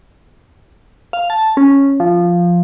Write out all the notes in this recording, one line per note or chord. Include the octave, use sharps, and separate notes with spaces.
F5
A5
C#4
F3